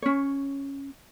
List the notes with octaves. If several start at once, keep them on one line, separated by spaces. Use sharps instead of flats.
C#4 C#5